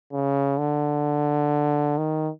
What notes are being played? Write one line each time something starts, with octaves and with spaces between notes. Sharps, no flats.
C#3
D3
D#3